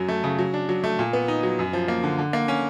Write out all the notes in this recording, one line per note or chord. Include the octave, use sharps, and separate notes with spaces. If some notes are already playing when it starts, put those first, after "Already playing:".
Already playing: F#2 F#3
A3
C#3
F#3
D4
F#3
A3
A#2
B3
D#4
F#3
F#2
F3
A#3
D3
D3
A#3
C#4